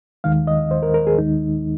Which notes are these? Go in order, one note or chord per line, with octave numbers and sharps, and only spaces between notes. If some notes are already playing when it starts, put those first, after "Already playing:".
D#2 D#3 G#3 F5
D#5
C5
A#4
A#4
G#4
D#2 D#3 G#3 D#4